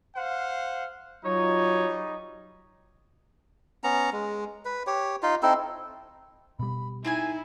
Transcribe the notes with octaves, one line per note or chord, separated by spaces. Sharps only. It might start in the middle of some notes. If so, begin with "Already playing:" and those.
C5 F5 F#5
F#3 G3 D#4 F4 C#5
B3 C#4 A#5
G#3
B4
G4 C#5
D#4 F4
C4 D#4 E4 A4
B2 G3 B5
C4 D#4 E4 G#4 G#5